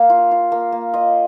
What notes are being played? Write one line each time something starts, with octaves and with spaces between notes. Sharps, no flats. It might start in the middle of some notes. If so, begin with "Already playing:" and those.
Already playing: A#3 F5
F4
F4
A#3
A#3
F4 D#5